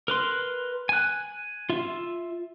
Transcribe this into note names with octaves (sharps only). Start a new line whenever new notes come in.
A#4 B4 C6
G#5 F#6
F4 E5